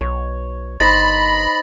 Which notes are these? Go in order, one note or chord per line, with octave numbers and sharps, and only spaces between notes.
B1 C#5
G1 D#4 C5 A#5 B5 A6 A#6